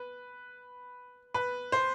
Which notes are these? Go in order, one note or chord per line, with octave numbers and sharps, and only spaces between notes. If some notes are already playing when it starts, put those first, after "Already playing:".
Already playing: B4
B4
C5